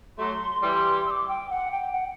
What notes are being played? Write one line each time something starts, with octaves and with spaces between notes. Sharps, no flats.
F#3 A3 C6
E3 G3 C6
E6
D6
G5
F#5
G5
F#5